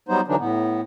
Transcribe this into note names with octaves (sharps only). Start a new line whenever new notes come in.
F#3 G3 B3 D#4 C5
D3 E3 F#3 D4 D#4
A2 B3